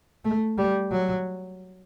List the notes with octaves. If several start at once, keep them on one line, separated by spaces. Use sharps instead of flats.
A3
G3
F#3